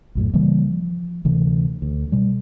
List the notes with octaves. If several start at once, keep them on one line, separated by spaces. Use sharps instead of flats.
B1 F#2 A2
C#3 E3 G3 A#3
F3
D2 C3 E3
D2
B2 G3